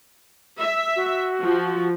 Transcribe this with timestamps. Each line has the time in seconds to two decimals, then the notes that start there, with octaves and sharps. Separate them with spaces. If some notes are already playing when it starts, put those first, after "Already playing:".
0.59 E5
0.96 F#4
1.40 F3